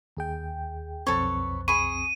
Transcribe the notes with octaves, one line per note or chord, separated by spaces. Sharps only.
D#2 G#4 G5
B1 F2 C4 A4 B4 C#5
G#4 B5 C#6 D#7